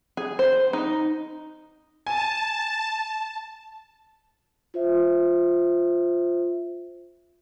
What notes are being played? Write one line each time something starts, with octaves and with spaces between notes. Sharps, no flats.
G#4
C5
D#4
G#5 A5
F4 C5 E5